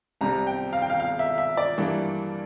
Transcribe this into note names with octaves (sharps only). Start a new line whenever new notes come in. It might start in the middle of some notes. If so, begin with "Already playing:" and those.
C2 C3 G3 C4 A#5
G5
F5
G5
F5
F5
E5
E5
D5
G2 E3 G3 A#3 D4